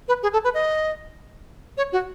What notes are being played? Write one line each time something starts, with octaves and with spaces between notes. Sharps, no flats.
B4
G#4
A4
B4
D#5
C#5
F#4